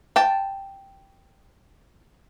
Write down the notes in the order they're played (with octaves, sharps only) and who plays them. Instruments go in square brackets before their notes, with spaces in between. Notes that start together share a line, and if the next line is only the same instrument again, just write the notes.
[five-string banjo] G5 A5